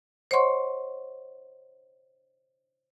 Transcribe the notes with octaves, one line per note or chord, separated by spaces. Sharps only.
C5 C#5 D#5 F#5 C6 C#6